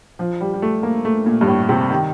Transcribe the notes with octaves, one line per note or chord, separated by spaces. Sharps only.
F3
G3
G3
A3
A#3
A3
A#2
G2
A2
C3
D#3